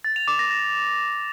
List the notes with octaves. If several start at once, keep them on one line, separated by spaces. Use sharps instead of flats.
A6
F7
D6
A#6
A#6